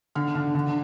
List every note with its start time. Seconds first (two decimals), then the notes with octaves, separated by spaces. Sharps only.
0.15 D3 F6
0.35 D3
0.55 D3